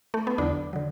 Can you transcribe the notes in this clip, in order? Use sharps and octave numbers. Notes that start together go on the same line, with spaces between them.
A3
B3
E2 D3 F#3 D4
D3 F#3